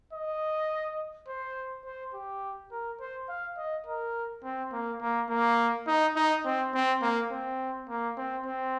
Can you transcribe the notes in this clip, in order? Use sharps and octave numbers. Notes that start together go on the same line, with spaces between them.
D#5
C5
C5
G4
A#4
C5
F5
D#5
A#4
C4
A#3
A#3
A#3
D#4
D#4
C4
C4
A#3
C4
A#3
C4
C4